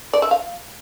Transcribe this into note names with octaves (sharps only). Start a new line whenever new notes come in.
D5
E5
F5